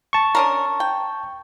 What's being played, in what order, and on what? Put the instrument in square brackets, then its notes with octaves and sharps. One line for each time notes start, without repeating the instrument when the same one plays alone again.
[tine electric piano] A5 C#6
[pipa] C#4 D4 A#4
G5